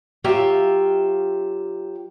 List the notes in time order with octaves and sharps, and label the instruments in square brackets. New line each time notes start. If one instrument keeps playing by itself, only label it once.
[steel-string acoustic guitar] F#3 F4 G4 E5 F5